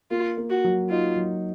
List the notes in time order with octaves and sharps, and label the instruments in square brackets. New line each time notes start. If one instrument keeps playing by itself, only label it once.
[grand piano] A#3 [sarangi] F4
[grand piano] A#3
[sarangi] F#4
[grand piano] F#3
[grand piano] D#4 [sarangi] F4
[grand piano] F#3